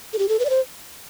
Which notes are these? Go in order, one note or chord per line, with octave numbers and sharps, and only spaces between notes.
A4
G4
A4
B4
D5
C5